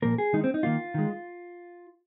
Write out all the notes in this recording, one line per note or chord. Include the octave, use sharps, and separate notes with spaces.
A#2 F3 A#3 A#4
G#4
D#3 G#3 D#4
C4
D#4
D#3 A#3 F4
D#3 G#3